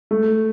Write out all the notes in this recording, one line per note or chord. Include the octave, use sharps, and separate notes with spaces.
A3